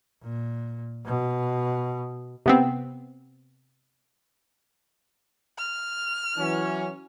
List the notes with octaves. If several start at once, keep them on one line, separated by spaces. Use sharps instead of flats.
A#2
B2
C3 B3 C4
F6
E3 F#3 C#4